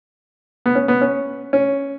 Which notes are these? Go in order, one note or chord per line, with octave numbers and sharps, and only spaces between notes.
B3
C#4
B3
C#4
C#4